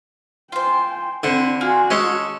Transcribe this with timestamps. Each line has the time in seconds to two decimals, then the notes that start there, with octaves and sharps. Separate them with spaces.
0.52 F4 C5 G5 G#5
1.23 D3 C4 D4 E4 C5
1.61 F4 F#4 G#4
1.90 G#3 C#4 A4 C#5